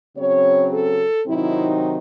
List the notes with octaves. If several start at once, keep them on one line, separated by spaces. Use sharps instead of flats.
C#3 F#3 C4 C#5
A4
C3 D#3 F#3 C4 D#4 E4